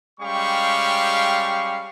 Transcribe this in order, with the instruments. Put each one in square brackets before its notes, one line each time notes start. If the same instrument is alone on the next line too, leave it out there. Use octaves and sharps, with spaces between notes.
[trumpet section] G3 G#3 C#4 G4 F5 C#6